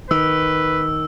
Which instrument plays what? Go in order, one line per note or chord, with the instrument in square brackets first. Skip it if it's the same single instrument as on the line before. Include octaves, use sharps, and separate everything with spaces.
[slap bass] D#3 [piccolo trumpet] B4 [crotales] E6